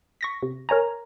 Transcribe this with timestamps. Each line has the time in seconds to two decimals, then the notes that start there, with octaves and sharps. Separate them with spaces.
0.21 C#6 A#6 B6
0.43 C3
0.69 A#4 C#5 G#5 A#5